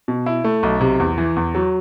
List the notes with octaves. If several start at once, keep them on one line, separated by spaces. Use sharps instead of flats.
B2
E4
A3
B1
C3
E2
E3
E2
F#3